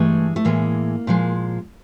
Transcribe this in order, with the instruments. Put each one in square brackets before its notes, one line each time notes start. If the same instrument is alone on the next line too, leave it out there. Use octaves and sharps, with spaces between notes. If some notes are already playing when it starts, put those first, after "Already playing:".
Already playing: [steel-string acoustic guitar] G2 E3 G#3 A3
A3
A2 E3 G#3 A#3
A#2 F3 G#3